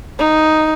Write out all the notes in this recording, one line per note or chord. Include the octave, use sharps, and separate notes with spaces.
D#4